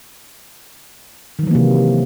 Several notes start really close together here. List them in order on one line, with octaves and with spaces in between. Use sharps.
D#3 F#3 E3 A#3 C3